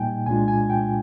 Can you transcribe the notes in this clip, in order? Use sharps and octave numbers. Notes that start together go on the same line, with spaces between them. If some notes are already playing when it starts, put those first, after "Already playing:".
Already playing: A#2 G3 A#3 D#4 G5 G#5
C2 A#2 G#3 D4 F4 G#5
G#5
G5